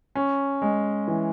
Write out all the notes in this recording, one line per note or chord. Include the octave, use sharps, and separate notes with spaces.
C#4
G#3
E3